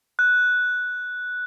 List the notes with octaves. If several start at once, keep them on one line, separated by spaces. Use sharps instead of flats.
F#6